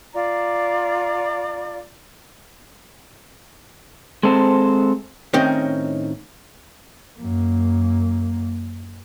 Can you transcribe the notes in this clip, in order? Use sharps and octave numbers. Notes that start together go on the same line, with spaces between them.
F4 D5 A#5
G#3 C4 A4 C5
A2 D#3 C4 C#4 D#4
F#2 A#3